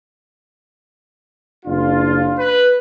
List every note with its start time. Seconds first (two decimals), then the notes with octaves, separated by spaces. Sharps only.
1.66 F#1 D4 F4
2.38 B4